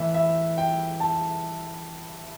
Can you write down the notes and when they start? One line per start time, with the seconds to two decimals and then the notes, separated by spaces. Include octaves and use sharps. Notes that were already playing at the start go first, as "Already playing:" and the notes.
Already playing: A2 E3 E5
0.14 E5
0.58 G5
1.00 A5